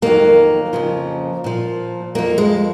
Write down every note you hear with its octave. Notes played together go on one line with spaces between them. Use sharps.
F2 D#3 F#3 A#3
F2 C#3 F3
A#2 F3
F2 F3 A#3
G#3